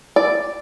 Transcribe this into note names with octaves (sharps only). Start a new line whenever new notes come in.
D5